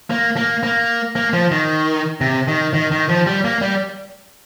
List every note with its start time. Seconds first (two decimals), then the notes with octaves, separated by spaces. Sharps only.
0.10 A#3
0.37 A#3
0.63 A#3
1.16 A#3
1.33 F3
1.51 D#3
2.21 C3
2.48 D#3
2.74 D#3
2.92 D#3
3.09 F3
3.27 G3
3.44 A#3
3.61 G3